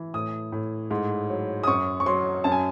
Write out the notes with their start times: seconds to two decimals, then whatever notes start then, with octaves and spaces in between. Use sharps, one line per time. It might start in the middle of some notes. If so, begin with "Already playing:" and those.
Already playing: E3
0.14 A2 D#6
0.52 A2
0.91 G#2
1.30 F#3
1.64 D#6
1.67 F#2 C#6
2.00 C#6
2.06 F#3 C6
2.44 F#2 A5
2.52 G#5